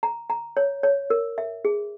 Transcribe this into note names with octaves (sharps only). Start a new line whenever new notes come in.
A#5
A#5
C#5
C#5
A#4
E5
G#4